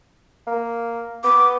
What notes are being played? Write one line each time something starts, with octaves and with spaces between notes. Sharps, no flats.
A#3
B3 D6